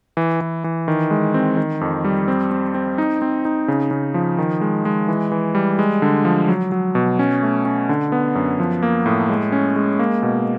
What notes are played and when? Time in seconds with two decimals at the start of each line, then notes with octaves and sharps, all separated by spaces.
0.17 E3
0.41 E3
0.64 E3
0.88 D#3
1.11 G#3
1.34 C4
1.57 D#3
1.81 F2
2.05 G3
2.28 C4
2.51 C4
2.74 C4
2.98 D#4
3.22 C4
3.45 D#4
3.68 C#3
3.91 C#3
4.14 F3
4.38 D#3
4.61 G#3
4.85 G#3
5.08 E3
5.32 E3
5.55 G3
5.79 G#3
6.02 D3
6.25 F3
6.49 F#3
6.72 F#3
6.95 B2
7.19 C#4
7.43 A3
7.65 C#4
7.89 D3
8.12 B3
8.35 F#2
8.60 F3
8.83 A#3
9.06 A2
9.29 G#3
9.52 C#4
9.76 G#3
9.99 A#3
10.23 B2